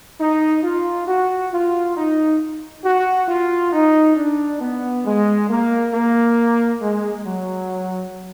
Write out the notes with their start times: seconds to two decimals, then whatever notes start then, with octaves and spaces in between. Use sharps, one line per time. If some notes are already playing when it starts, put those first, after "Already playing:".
0.19 D#4
0.64 F4
1.07 F#4
1.52 F4
1.96 D#4
2.84 F#4
3.29 F4
3.73 D#4
4.16 D4
4.61 B3
5.05 G#3
5.49 A#3
5.93 A#3
6.81 G#3
7.26 F#3